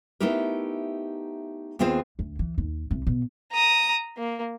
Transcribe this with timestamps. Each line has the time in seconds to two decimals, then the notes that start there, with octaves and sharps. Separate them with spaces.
0.20 A3 B3 D#4 E4 G4 A#4
1.79 D#2 B3 C4 F4 G#4 C5
2.19 D2
2.39 E3
2.58 D#2
2.91 C2
3.07 B2
3.52 A#5 D#6
4.17 A#3